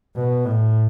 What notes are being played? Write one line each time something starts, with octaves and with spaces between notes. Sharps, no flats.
B2
A2